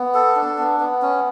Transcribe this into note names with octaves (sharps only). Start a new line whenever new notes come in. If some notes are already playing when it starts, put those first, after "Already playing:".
Already playing: B3
A4
D4
B3
B3
C#4